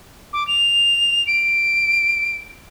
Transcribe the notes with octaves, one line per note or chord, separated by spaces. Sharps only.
D6
F7
D7